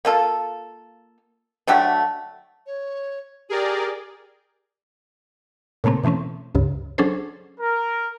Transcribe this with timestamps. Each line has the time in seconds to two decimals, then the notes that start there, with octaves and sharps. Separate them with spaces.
0.05 A#3 F4 A4
1.67 D3 F#3 A3 G4
2.67 C#5
3.49 G4 G#4 A#4 D5
5.84 A#2 C#3 A3 A#3 C4
6.03 B2 E3 A3 C4 C#4
6.55 C#2 G2 C#3
6.98 F#3 C#4 D4 G#4 A4 C5
7.60 A#4